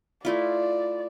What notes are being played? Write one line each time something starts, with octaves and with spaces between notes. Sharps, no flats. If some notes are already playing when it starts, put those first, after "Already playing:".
A3 E4 F4 D5